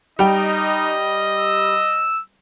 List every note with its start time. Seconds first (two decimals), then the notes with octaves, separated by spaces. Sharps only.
0.19 G3 D#4 D#5 G5
1.38 E6